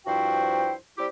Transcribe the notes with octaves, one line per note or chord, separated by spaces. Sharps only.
G2 F3 E4 F#4 C5 G5
G3 C4 E4 G4